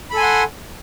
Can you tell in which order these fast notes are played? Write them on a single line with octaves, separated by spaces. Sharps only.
B5 A4 G#5 C6 F#5